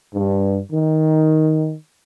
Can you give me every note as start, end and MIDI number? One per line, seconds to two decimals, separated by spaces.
0.15 0.59 43
0.72 1.74 51